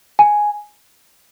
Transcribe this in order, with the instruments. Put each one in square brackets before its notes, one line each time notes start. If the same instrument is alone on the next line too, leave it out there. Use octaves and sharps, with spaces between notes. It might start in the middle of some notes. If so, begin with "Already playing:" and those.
[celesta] G#5